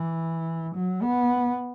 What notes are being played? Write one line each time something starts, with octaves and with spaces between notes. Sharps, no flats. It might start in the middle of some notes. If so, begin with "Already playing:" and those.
Already playing: E3
F#3
B3